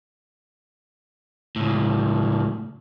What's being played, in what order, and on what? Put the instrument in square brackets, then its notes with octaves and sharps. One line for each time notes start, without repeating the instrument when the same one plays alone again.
[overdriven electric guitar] C#2 A2